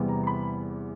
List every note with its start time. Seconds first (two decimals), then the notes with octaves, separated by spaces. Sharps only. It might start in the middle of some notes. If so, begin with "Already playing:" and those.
Already playing: E2 C3 E3 G3 B3
0.08 A#5
0.23 C6
0.27 B5